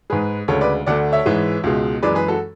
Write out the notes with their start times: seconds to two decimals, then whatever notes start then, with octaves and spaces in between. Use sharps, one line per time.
0.10 G#2 G#3 G#4 B4
0.48 D2 C#3 G#3 A4 C#5
0.61 B4 D5
0.86 D2 D3 A3 D5 F#5
1.12 C#5 E5
1.26 G#2 E3 G#3
1.63 C#2 B2 G#3
2.03 F#2 E3 G#3 B4 D5
2.15 G#4 B4
2.28 F#4 A4